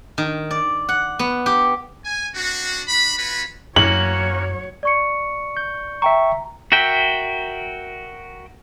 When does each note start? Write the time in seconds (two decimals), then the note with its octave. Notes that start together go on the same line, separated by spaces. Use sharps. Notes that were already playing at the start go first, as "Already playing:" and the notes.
0.18 D#3
0.51 D5
0.89 F#5
1.19 B3
1.46 G4
2.05 G#5
2.35 C4 D4 F#4
2.87 D4 F#4 B5
3.17 C#4 F4 F#4 B4 B5
3.76 F#2 F#3 A#3 C#4 F#4 C#5 F#7
4.83 D5 C#6 C#7
5.57 G6
6.02 E5 G5 A#5 C#6
6.72 F#4 A#4 E5 G5